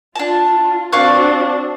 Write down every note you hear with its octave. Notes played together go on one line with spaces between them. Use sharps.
D4 F4 A5
C4 D4 F#4 F5 C#6 F#6